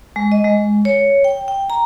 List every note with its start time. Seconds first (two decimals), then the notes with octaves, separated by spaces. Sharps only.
0.16 G#3
0.32 D#5
0.44 G#3
0.85 C#5
1.24 G5
1.48 G5
1.70 A#5